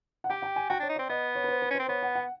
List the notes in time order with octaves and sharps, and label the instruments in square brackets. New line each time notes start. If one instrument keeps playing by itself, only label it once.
[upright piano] F#5
[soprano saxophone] G4 [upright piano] G5
[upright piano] G5
G#5
[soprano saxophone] F#4 [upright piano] G5
[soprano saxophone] D4 [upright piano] C#5
[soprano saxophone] D#4
[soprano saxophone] C4 [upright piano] D5
[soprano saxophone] B3 [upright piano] D#5
[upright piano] C#5
B4
C5
B4
[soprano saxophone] C#4
[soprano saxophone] C4 [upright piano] C5
[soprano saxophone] B3 [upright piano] C#5
[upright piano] F#5
F#5